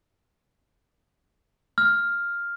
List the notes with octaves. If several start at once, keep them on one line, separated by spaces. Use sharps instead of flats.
F6